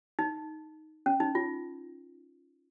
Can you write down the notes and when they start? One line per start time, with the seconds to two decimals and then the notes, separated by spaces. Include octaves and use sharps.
0.19 D#4
1.06 C#4
1.20 D#4
1.35 F4